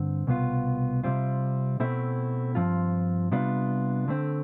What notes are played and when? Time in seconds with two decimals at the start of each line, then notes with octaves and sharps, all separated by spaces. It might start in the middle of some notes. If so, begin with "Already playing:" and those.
Already playing: G2 D3 C4
0.27 C2 B2 B3 F4
1.04 C3 G3 C4 F4
1.80 B2 A3 C4 E4
2.55 G2 F3 C4 F4
3.31 C3 G3 B3 D4 F4
4.08 D3 A3 C4